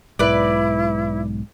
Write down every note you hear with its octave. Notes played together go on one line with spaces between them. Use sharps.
B1 G#2 G#3 E4 B4 D5